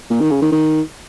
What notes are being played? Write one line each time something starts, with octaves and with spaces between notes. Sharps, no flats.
A#2
D#3
C#3
D#3
D#3